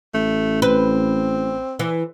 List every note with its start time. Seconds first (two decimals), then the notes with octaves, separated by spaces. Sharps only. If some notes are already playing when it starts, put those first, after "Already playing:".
0.14 A1 A3
0.62 C4 B4
1.79 E3